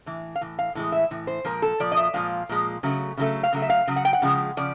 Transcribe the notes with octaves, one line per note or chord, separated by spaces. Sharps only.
A2 E3
F5
A2 E3
F5
A2 E3 G#3
E5
A2 E3
C5
A#2 F3 G#3 A#4
A4
A#2 F3 D5
D#5
E5
A#2 F3 G#3 F5
A#2 F3 G#3
C#3 F#3 A3
C#3 F#3 A3
F5
C#3 F#3 A3
E5
F5
C#3 F#3
F#5
G5
F#5
C#3 F3 G#3
C#3 F3 D5